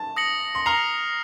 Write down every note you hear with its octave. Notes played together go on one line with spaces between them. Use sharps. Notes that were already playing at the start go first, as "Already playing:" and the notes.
Already playing: A5
D#6 A#6 C#7 F#7
C6
A#5 F6 C7 F7